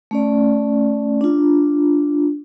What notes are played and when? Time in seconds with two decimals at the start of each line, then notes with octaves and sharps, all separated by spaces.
0.11 A3 C#4 D5
1.21 D4 F4